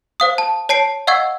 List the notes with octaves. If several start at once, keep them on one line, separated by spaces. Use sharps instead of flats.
C5 F5 D#6
A5
C#5 A5 C7 D7
D#5 F5 F#5 C#6 E6 G#6